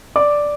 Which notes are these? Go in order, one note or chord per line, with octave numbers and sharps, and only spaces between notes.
D5 D6